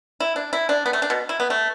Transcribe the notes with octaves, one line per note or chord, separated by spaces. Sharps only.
E4
D4
E4
D4
B3
A3
D4
B2
E4
B3
A3